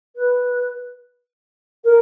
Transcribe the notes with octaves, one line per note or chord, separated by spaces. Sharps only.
B4
A#4